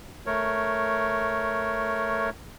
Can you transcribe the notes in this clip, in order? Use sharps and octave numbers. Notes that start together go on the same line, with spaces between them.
A3 A#4 C#5